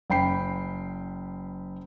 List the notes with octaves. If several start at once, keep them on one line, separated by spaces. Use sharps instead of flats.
F#1 G5 B5 C7